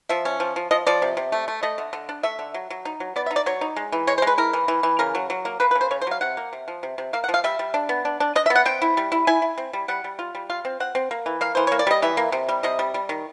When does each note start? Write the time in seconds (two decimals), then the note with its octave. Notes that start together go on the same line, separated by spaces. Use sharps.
0.09 F3 E5
0.25 C#4
0.40 F3
0.56 F3
0.71 F3 D#5
0.87 F3 D5
1.02 C3
1.17 C3
1.32 A3
1.48 A3
1.63 A3 D#5
1.78 D3
1.93 D3
2.09 D4
2.23 A3 E5
2.39 D3
2.54 F#3
2.70 F#3
2.85 D#4
3.00 F#3
3.16 B3 D5
3.26 E5
3.31 D#4
3.36 D5
3.46 F#3 C#5
3.61 D#4
3.76 G#3
3.92 E3
4.07 G#3 C#5
4.18 C5
4.22 G#3
4.27 B4
4.38 E4 A#4
4.53 E3
4.68 E3
4.83 E3
4.99 C#3 A#4
5.15 F#3
5.30 F#3
5.45 A#3
5.60 A#3 B4
5.71 B4
5.75 C#3
5.81 C5
5.91 C#3 C#5
6.01 C5
6.07 F#3 F5
6.21 C3 F#5
6.37 A#3
6.53 C3
6.68 F3
6.83 C3
6.98 C3
7.13 A#3 F5
7.24 F#5
7.29 F3
7.34 F5
7.44 G3 E5
7.59 G3
7.74 D4
7.89 B3
8.05 D4
8.20 D4
8.35 D4 D#5
8.46 E5
8.50 B3
8.55 F#5
8.66 C4 G5
8.82 E4
8.97 G3
9.12 E4
9.27 E4 G#5
9.42 E4
9.58 C4
9.73 G3
9.88 G3 F#5
10.04 G3
10.19 F4
10.35 G3
10.50 F4 F5
10.65 C4
10.80 C4 F#5
10.95 C4
11.11 A#3
11.26 E3
11.41 A#3 F5
11.55 E3 C5
11.67 A#3 C#5
11.79 D5
11.87 G3 D#5
12.02 E3 E5
12.17 A#3
12.32 C3
12.49 G3
12.63 C3 D#5
12.79 G3
12.94 G3
13.09 D#3